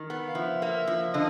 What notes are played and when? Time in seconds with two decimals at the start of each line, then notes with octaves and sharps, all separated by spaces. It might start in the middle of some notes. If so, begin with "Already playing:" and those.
Already playing: D#3
0.10 B3
0.28 F5
0.35 F3 E5
0.62 A#3
0.87 F3
1.14 D3 D#5